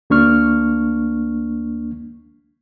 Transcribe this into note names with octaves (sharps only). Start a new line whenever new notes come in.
D2 A#3 D4 C#6 F6